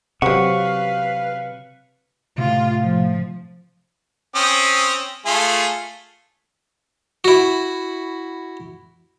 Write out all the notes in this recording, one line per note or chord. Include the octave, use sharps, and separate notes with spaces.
C3 F#3 C4 B4 F5 F#5 C#6
A2 C3 F4
F3
C4 C#4 D#6
A3 F4 G#4
E4 F#4